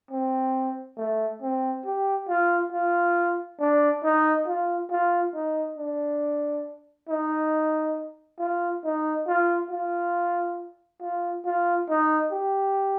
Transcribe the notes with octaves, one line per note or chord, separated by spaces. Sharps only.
C4
A3
C4
G4
F4
F4
D4
D#4
F4
F4
D#4
D4
D#4
F4
D#4
F4
F4
F4
F4
D#4
G4